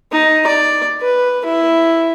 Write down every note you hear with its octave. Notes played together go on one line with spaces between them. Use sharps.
D#4
D5
B4
E4